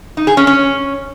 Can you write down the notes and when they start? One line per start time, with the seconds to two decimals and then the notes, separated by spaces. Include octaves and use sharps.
0.17 D#4
0.27 G#4
0.37 C#4
0.47 C#4